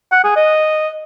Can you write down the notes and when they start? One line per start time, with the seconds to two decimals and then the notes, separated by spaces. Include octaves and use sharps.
0.12 F#5
0.24 G#4
0.36 D#5